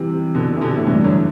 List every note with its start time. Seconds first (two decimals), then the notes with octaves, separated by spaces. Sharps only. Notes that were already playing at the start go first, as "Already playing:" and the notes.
Already playing: C3 E3 G3
0.35 B2 D3
0.57 E3
0.61 B2 D3
0.77 A2
0.87 G2 B2 E3 A3 D4
1.04 D3 F#3